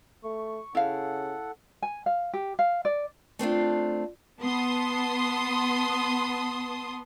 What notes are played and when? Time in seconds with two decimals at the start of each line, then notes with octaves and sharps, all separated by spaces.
0.24 A3 C#6
0.75 C#3 E4 A4 F5 F#5
1.82 G#5
2.06 F5
2.34 G4
2.59 F5
2.85 D5
3.39 A3 C4 D4 F4
4.41 B3 A5 C6 D#6